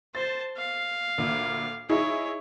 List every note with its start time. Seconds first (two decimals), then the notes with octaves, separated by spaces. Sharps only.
0.15 C5 A5 A6
0.57 F5
1.18 D2 A#2
1.89 D#4 E4 G#4 C#5